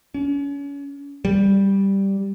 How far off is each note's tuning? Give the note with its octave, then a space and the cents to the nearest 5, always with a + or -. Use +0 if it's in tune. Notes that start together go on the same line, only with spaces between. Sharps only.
C#4 +35
G3 +0